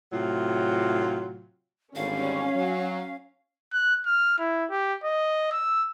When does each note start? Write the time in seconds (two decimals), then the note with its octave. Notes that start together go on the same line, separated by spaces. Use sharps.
0.12 A2 C3 F#3 F4
1.96 G#1 D3 G3 C#4 F5
2.55 F#3
3.73 F#6
4.06 F6
4.38 E4
4.70 G4
5.04 D#5
5.52 E6